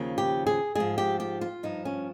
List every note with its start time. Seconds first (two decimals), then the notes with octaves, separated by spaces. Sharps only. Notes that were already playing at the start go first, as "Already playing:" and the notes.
Already playing: D#2 C#3 F3
0.18 G4
0.47 G#4
0.75 G#2 F3 G#4
0.98 G4
1.20 G4
1.41 F4
1.63 G2 F3 D#4
1.85 C#4